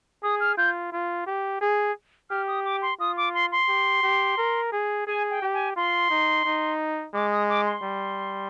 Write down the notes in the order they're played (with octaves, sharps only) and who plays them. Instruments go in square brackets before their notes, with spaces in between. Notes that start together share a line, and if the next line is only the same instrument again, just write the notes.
[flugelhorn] G#4 [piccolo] D#6
[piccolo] F6
[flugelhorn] F4 [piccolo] G6
[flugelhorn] F4
G4
G#4
[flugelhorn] G4 [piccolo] F6
[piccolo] D#6
D6
C6
[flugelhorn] F4 [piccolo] D#6
[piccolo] D6
C6
C6
[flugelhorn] G4
G4
A#4
G#4
[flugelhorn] G#4 [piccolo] G#5
[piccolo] G5
[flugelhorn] G4
[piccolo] G#5
[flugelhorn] F4 [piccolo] C6
[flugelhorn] D#4
D#4
[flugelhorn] G#3 [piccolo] D6
[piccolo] D#6
D6
C6
[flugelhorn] G3